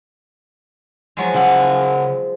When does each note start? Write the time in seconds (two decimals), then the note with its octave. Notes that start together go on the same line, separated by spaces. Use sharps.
1.17 F3 F#3 G#3
1.34 C#3 F#5